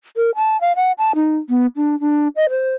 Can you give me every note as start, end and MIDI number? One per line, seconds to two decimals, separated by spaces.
0.17 0.31 70
0.36 0.59 81
0.61 0.73 77
0.76 0.92 78
0.98 1.12 81
1.15 1.37 63
1.49 1.66 59
1.76 1.99 62
2.00 2.28 62
2.36 2.49 75
2.50 2.74 72